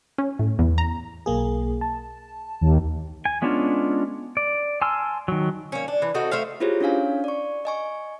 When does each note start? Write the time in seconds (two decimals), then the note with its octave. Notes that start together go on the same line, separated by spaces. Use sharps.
0.18 C#4
0.39 A2
0.59 E2
0.78 A#5
1.26 B1 A#3 G#4
1.81 A5
2.61 D#2
3.25 G#5
3.42 G#3 B3 C#4 D4 F4
4.37 D5
4.82 G#5 A5 C6 E6 F6
5.28 D#3 F#3
5.72 A#3 C#4
5.88 D4
6.02 E3
6.14 A3 C4 D#4 F#4
6.31 A3 C5 E5 F5
6.60 E4 F4 G4 G#4 C5 C#5
6.81 C#4 D4 C#5 F5 G#5
7.24 D5 C#6
7.65 D#5 G#5 C#6